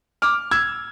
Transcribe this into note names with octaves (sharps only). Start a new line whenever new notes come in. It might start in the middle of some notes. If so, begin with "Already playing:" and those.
D6 F6
E6 G#6